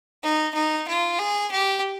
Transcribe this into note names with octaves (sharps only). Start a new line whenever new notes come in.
D#4
D#4
F4
G#4
G4